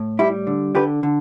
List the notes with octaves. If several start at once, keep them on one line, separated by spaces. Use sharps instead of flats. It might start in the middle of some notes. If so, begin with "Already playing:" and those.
Already playing: A2
G3 E4 G4
D3
D3 G4 B4
D3